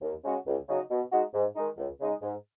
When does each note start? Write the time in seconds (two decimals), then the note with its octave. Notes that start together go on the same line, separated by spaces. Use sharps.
0.02 D#2
0.24 C#3 G#3 C#4 F#4
0.46 C#2
0.68 C#3 F#3 D#4 F#4
0.90 B2
1.12 G#3 D#4 F#4
1.34 G#2
1.56 D#3 G#3 D#4
1.77 C#2
2.00 C#3 G#3 D#4
2.22 G#2